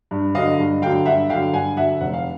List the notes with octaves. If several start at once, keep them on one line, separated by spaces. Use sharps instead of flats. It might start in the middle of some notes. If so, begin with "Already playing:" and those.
G2
D3 F#3 D#5 F5
G2
D3 F#3 F5 G5
G2 E5 F#5
D3 F#3 F5 G5
G2 F#5 G#5
D3 F#3 E5 F#5
F1 F#5
F5